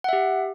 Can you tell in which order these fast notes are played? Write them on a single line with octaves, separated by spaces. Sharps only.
F#5 E5 G4